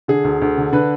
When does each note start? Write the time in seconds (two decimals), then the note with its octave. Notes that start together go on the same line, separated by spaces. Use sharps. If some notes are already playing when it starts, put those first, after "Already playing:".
0.08 D3 G#4
0.24 D2
0.41 D2
0.58 D3
0.72 D3 B4